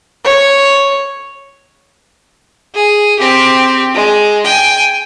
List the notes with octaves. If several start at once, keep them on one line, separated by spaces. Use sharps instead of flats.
C#5
G#4
C4 G4
G#3
G5 G#5